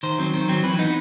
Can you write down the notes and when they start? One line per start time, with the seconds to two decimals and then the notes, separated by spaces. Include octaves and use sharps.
0.03 D#3 C5
0.19 F#3 C4
0.34 D#3
0.48 F#3 C4
0.63 E3 B4
0.79 B3 D#4